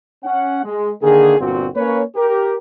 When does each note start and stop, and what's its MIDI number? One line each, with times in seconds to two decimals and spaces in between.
0.24 0.62 61
0.24 0.62 78
0.63 0.90 56
1.01 1.37 50
1.01 1.37 51
1.01 1.37 58
1.01 1.37 68
1.39 1.67 31
1.39 1.67 46
1.39 1.67 60
1.39 1.67 66
1.75 2.01 58
1.75 2.01 61
1.75 2.01 71
1.75 2.01 73
2.15 2.54 67
2.15 2.54 70